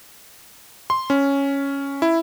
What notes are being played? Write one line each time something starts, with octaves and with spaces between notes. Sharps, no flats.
C6
C#4
E4